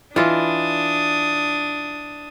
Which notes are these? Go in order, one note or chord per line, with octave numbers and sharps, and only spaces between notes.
E3 D4 F4 D#5 D#6